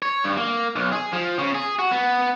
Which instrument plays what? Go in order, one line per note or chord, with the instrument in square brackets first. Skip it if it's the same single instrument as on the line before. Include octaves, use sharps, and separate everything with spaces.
[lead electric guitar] C#5
G2
A#3
B1
G#4
F3
C#3
G#4
F#4
B3